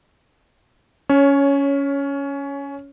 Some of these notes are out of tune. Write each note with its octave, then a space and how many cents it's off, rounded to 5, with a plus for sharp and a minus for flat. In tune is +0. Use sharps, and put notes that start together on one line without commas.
C#4 +15 C#5 +0